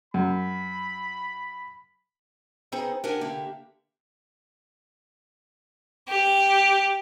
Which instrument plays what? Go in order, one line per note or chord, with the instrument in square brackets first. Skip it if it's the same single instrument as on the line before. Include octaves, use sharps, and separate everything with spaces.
[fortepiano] F#2 [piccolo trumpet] B5
[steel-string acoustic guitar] B3 C4 D#4 G#4 C5
D4 G4 A#4 F#5 G#5
D3 A#3 G4 E5
[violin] G4